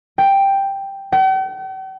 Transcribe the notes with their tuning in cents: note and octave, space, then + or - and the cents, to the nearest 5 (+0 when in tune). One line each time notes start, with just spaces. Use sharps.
G5 +5
G5 -45